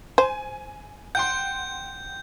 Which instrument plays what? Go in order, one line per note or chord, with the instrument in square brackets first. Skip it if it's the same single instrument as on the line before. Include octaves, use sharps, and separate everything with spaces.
[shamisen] C5 [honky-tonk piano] G#5
[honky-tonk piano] F#5 G5 C6 [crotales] G6